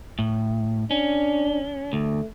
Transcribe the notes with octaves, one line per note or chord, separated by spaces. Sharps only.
A2
C#4 D4
D2 A3